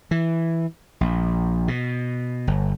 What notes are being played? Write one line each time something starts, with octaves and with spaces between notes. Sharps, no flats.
E3
A#1
B2
G1